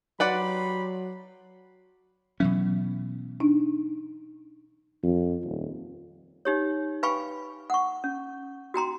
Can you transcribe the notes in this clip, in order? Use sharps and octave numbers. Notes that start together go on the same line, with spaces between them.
F#3 G4 B4 D5 F#5 B5 C6
B2 E3 F#3 C#4
D4 D#4
F2
D#1
D#4 G4 C#5
B4 F5 G5 G#5 B5 C#6
F#5 C#6
C#4
F#4 G5 A#5 C6